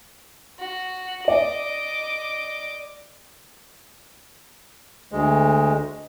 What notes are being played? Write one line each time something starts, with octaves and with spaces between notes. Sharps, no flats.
F#4
D5 D#5 D6
D2 G#3